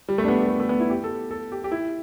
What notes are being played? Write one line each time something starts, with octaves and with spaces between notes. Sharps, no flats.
G3
A3
D4
B3
G3
A3
A3
B3
E4
G4
A4
A4
G4
G4
E4